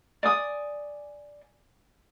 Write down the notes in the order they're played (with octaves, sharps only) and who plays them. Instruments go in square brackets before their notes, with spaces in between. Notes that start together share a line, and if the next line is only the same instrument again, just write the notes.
[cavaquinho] D5 G#5 D#6